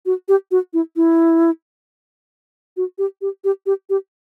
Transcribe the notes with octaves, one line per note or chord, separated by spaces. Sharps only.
F#4
G4
F#4
E4
E4
F#4
G4
G4
G4
G4
G4